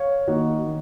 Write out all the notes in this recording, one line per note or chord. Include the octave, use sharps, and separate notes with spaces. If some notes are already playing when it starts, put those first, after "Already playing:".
Already playing: C#5 F5
D#3 A#3 D#4 F#4
D#3